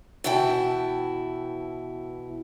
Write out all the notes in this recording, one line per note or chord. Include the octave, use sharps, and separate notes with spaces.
B2 E3 E4 G5 A5